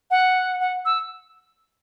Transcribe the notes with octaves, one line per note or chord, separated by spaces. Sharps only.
F#5
F#5
E6